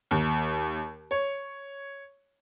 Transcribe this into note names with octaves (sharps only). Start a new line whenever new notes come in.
D#2
C#5